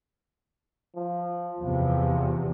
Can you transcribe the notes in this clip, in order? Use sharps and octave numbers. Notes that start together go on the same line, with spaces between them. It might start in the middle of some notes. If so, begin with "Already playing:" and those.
F3
E2 C3 F3